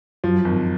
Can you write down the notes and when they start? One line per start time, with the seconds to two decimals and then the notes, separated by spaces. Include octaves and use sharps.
0.24 F#2 F3 F#3
0.45 G#1